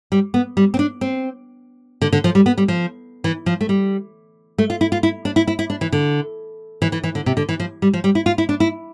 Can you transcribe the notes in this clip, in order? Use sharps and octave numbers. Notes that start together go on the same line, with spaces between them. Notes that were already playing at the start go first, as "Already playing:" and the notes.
G3
B3
G3
C4
D4
C4
D3
D3
F3
G3
B3
G3
F3
E3
F3
A3
G3
A3
F4
E4
F4
E4
D4
E4
E4
E4
D4
E3
D3
E3
E3
E3
D3
C3
D3
E3
F3
G3
F3
G3
E4
F4
E4
D4
E4